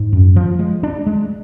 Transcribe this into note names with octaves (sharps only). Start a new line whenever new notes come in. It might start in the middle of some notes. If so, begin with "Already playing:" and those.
Already playing: G#2
F#2
F3
G#3
D4
G#3